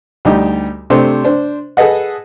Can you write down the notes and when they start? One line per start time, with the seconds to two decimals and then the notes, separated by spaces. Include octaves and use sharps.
0.25 D2 G3 D#4 G4
0.90 C3 A3 D4 C5
1.24 D4 C5
1.77 G#4 A4 B4 D#5 F#5